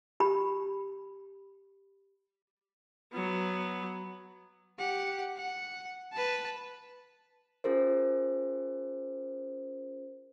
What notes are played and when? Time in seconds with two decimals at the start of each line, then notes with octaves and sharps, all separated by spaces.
0.20 G4 B5
3.13 F#3 B3
4.79 G4 F#5
5.37 F#5
6.13 B4 A5
7.64 C#4 F4 G#4 A#4 C5